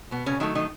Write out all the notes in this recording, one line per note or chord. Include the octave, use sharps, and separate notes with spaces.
B2 B3
C#3 C#4
D#3 F#3 A3 D#4
D#3 D#4